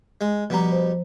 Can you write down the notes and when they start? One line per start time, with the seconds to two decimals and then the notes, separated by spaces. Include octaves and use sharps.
0.21 G#3
0.50 B2 F3 G3 A#5
0.72 C5